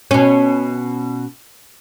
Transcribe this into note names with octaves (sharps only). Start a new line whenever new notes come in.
B2 C#4